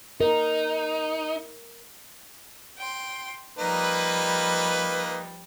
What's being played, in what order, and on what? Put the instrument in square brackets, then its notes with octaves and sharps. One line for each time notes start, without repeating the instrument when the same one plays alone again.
[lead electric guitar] D#4 [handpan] A#4
[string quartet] G5 C6
[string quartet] F3 G3 [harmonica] A#3 D#4 [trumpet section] B4